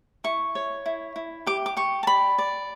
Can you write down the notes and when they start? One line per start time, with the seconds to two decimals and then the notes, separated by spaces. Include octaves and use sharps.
0.24 E4 C#6
0.55 C#5
0.86 E4
1.16 E4
1.47 G4 D6
1.66 D6
1.77 G4 C#6
2.03 A5
2.07 D5 B5
2.38 D5